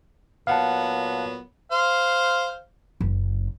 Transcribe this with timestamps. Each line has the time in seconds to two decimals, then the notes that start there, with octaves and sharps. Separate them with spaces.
0.47 A#2 F#3 B3 F5 F#5 A5
1.72 C5 F5
3.01 F#1